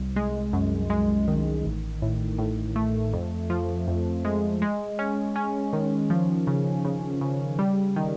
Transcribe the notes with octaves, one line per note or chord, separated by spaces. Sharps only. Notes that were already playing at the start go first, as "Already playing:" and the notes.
Already playing: C2
G#3
F#2
G#3
D#3
A1
A2
A2
A3
F2
F3
F2
G#3
G#3
C#4
C#4
D#3
F3
C#3
C#3
C#3
G3
D#3